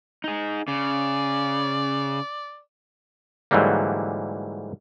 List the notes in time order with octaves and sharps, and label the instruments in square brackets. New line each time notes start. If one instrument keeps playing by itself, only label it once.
[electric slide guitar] D#4 G#4
[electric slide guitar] C#3 [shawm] D5
[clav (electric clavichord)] G#2 D3 E3 F#3 G3 A#3